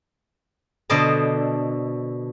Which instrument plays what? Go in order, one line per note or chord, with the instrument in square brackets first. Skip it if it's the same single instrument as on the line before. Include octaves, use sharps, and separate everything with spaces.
[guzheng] B2 D3 C5 D5 D#5 A5